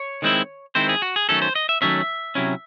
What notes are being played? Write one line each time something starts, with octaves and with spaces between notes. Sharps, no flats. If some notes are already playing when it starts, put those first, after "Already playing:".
Already playing: C#5
D#3 G#3 C4 E4
D#3 G#3 C4 E4 C5
G#4
F#4
G#4
D#3 F#3 A3 C#4 A4
C5
D#5
E5
D#3 F#3 A3 C#4 E5
C3 F#3 C#4 E4